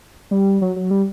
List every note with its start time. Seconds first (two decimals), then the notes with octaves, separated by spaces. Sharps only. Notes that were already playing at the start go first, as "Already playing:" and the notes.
0.31 G3
0.61 F#3
0.76 F#3
0.91 G3